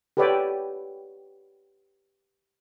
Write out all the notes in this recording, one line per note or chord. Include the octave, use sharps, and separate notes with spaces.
G4 A4 B4 C#5 D5 G5